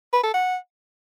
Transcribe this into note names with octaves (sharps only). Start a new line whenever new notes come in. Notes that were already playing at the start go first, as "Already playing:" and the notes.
B4
A4
F#5